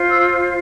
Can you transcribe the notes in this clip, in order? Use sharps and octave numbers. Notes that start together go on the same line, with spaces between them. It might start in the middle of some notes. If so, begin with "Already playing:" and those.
Already playing: F4 C5
E6